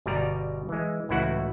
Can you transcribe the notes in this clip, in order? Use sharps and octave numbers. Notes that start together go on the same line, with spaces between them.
G1 B2 G3 D5 A#5
E3 G#3
C#2 A2 E3 E4 F#4 F#5